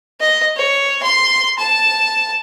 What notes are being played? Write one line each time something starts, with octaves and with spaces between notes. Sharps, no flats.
D#5
C#5
C6
A5